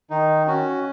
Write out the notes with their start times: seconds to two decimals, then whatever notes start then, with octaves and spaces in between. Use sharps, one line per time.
0.10 D#3 D#4
0.47 C#4 F#4